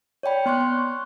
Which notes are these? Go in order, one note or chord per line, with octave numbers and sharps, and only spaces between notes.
C#5 D5 G5 B5
B3 C6 C#6 F#6
C#6